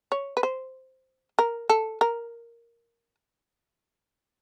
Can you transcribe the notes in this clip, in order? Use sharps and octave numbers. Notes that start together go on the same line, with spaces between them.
C#5
B4
C5
A#4
A4
A#4